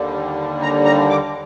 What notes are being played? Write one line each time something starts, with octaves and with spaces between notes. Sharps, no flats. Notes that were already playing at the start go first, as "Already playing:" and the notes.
Already playing: D#2 D3 G3
A#5
A#5
D6